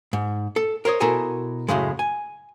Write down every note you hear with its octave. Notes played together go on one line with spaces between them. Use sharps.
G#2
A4
A#4 C5 C#5 D#5
B2 E4 A4 A#4 C5 G#5
F#2 A2 C#3 G#3
G#5